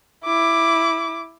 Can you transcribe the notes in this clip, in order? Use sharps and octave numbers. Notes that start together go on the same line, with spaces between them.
E4 D6